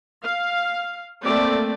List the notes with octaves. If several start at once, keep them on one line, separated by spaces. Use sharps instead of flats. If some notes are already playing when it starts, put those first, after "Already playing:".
F5
A3 A#3 C4 D5